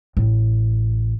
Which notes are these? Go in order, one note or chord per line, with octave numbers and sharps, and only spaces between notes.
A1